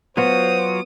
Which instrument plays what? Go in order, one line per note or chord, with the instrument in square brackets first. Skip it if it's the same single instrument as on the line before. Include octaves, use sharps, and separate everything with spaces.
[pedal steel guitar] F#3 F4 F#4 [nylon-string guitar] B3 [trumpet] C5 [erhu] D#6